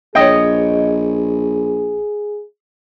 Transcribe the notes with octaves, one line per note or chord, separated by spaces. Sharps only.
A#1 G#4 C#5 D#5 G5